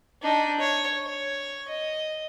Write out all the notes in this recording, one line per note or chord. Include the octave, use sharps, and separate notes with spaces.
D4 D#4
C#5
C#5
D#5